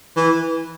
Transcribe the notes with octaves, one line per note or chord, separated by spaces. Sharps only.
E3